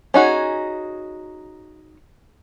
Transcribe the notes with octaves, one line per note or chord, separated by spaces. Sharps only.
C#4 D#4 F#4 G#4